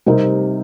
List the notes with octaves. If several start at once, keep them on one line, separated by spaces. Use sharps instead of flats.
C3 G3 C4 D#4 A#4